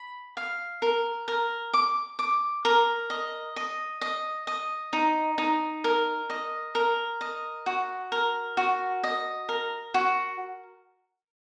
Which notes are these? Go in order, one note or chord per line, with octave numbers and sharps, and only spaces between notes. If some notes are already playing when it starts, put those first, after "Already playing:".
Already playing: B5
F5
A#4
A#4
D6
D6
A#4
D#5
D#5
D#5
D#5
D#4
D#4
A#4
D#5
A#4
D#5
F#4
A#4
F#4
D#5
A#4
F#4